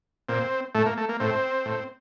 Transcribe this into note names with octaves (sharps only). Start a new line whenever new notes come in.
A#2 C4
A2 A3
A#3
A3
A#3
A2 C4
A2